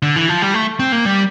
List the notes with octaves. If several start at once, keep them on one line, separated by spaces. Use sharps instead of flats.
D3
E3
F3
G3
A3
C4
A#3
G3